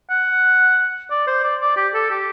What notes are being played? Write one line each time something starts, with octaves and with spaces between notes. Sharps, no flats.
F#5
D5
C5
D5
D5
G4
A4
G4